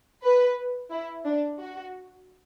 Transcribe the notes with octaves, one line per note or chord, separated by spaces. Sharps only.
B4
E4
D4
F#4